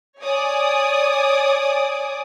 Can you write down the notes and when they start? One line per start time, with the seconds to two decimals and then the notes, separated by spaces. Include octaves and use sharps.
0.22 C#5 D5 G#5 D6 D#6